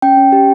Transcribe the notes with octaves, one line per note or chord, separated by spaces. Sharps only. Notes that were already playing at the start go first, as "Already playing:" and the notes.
C#4 G5
C#4
G4